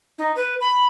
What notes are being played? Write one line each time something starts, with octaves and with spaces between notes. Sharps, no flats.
D#4
B4
B5